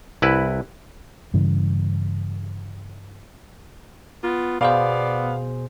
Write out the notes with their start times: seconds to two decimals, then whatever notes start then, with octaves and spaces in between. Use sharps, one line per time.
0.22 C2 E4 B4
1.34 G2 C#3 E3
4.24 B3 F4
4.61 B2 B3 G#4 C5 D5 F5